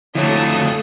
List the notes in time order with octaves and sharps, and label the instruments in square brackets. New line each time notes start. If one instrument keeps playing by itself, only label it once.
[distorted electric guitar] F2 F#3 [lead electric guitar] D3 [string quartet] A3 A4 D#6 [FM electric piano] E4 C#5